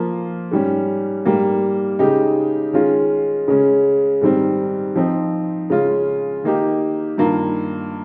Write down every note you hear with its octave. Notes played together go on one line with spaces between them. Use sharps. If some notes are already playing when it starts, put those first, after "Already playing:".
Already playing: F3 A#3 F4
G#2 G3 C#4
G#2 G3 A#3
C#3 G#3 D#4 G4
D#3 G#3 C#4 F4
C#3 G#3 C#4
G#2 D#3 G3 C4
F3 C4 D#4
C#3 G#3 C#4 F4
D#3 A#3 D#4 G4
G2 D#3 A#3 F4